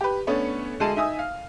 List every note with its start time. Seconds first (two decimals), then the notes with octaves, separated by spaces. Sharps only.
0.01 G4 B4
0.27 A3 B3 C#4 D4 C#5
0.80 D2 G#3 G#4 A5 D#7
0.96 D#4 E5 G#5 D#6
1.19 F5